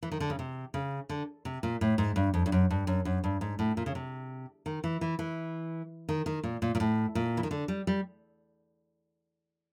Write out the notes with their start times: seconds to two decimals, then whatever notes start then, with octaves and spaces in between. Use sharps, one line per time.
0.03 E3
0.12 D#3
0.20 D3
0.30 C#3
0.39 C3
0.74 C#3
1.09 D3
1.45 C3
1.63 A#2
1.81 A2
1.98 G#2
2.16 G2
2.34 F2
2.46 G2
2.52 F#2
2.70 G2
2.87 F#2
3.05 F#2
3.24 G2
3.41 G#2
3.59 A2
3.77 A#2
3.86 C#3
3.95 C3
4.66 D#3
4.84 E3
5.01 E3
5.19 E3
6.09 D#3
6.26 D#3
6.43 A#2
6.62 A#2
6.75 A#2
6.80 A2
7.15 A#2
7.37 E3
7.43 D#3
7.51 D3
7.68 G3
7.87 G3